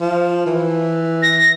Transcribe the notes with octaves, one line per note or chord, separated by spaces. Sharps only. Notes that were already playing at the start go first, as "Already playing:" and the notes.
F3
E3
A#6